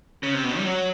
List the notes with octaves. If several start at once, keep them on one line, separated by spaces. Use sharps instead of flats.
C#3
C3
B2
G3
F#3